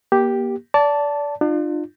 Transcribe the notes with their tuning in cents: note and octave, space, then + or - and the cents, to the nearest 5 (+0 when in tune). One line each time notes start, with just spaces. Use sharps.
A#3 +35 G4 +0
D5 -25 A5 +0
D4 +45 F4 +0